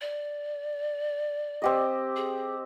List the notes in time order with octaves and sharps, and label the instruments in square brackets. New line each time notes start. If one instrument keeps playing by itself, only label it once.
[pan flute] D5
[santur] C4 G4 D#5
[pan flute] G#4